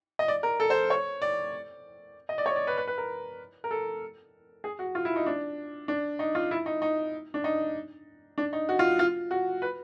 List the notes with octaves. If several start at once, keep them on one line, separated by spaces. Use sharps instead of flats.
D#5
D5
A#4
A4
C5
C#5
D5
D#5
D5
C#5
D5
B4
B4
B4
A#4
A#4
A4
G#4
F#4
F4
E4
D#4
D4
D4
D#4
F4
E4
D#4
D#4
D4
D#4
D4
D#4
F#4
F4
F4
F#4
B4